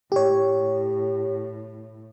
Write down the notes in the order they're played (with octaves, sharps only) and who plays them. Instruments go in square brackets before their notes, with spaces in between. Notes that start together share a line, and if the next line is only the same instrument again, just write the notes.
[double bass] A2 [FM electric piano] G4 C#5